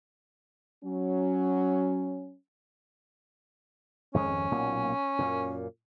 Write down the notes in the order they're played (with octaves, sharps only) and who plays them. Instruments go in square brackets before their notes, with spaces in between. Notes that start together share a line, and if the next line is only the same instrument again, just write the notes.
[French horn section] F#3 C#4
[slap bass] G#1 F2 G#3 [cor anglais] C#4
[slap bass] B1 A#2 A#3
F#2 A#2